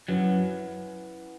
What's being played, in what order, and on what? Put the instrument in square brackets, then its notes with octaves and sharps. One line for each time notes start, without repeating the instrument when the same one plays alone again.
[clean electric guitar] F#2 F#3 [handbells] C#4 E4 B4 F#5